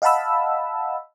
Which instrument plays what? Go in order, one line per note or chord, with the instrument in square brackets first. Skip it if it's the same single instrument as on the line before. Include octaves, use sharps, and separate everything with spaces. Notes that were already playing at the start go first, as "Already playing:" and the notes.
[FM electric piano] D#5 F5 F#5 A5 B5 E6